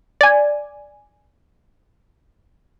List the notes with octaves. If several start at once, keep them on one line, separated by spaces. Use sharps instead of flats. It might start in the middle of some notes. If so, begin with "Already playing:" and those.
D5 G#5